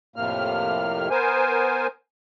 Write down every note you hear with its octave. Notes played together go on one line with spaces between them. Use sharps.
F2 A2 C3 A#3 F6
B3 A#4 C5 G#5